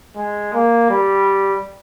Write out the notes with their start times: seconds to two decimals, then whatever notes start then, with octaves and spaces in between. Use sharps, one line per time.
0.16 G#3
0.54 A#3
0.90 G3